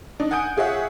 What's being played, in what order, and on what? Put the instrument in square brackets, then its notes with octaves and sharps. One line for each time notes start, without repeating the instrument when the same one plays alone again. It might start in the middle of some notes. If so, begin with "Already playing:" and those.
[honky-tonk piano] D4 D#4
F#5 G#5 D#6 G6 D7
F4 G#4 C#5 E5 F#5